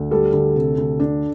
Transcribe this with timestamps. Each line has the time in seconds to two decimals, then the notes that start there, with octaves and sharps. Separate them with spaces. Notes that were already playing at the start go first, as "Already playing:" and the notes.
Already playing: D2
0.11 G3 A4
0.33 D2
0.56 C3
0.78 D2
1.00 D4